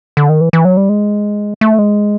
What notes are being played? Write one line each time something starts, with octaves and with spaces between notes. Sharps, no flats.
D3
D#3
E3
E3
F#3
G3
G#3
A3
G#3